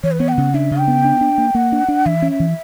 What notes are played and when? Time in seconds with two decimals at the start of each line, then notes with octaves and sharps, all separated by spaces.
0.03 E3 C#5
0.11 B4
0.19 B3 C#5
0.28 G5
0.32 F#5
0.38 C#3
0.54 D4 E5
0.71 C#3
0.79 G5
0.88 B3
1.04 D4
1.21 D4
1.38 A#3
1.55 A#3 F#5
1.72 D4
1.88 D4
2.05 E3 E5
2.22 C#4
2.31 E5
2.40 E3